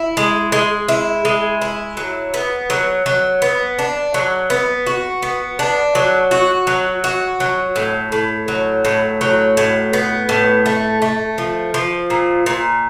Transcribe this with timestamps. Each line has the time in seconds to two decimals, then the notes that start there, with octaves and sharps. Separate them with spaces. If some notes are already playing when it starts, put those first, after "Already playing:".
Already playing: E4
0.17 G#3
0.52 G#3
0.88 E4
1.25 G#3
1.62 E4
1.97 F#3
2.34 B3
2.70 F#3
3.06 F#3
3.42 B3
3.79 D4
4.14 F#3
4.50 B3
4.86 F#4
5.22 B3
5.59 D4
5.95 F#3
6.31 F#4
6.67 F#3
7.04 F#4
7.40 F#3
7.76 A2
8.12 A2
8.48 F#3
8.85 A2
9.21 F#3
9.57 A2
9.93 B3
10.29 A2
10.66 A3
11.02 A3
11.38 F3
11.74 F3
12.10 A#2
12.46 A#2